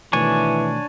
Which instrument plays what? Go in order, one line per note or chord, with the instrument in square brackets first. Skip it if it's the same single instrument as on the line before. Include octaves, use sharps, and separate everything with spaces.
[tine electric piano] B2 D#3 A3 [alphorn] E3 [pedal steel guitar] D4 C#5 G#5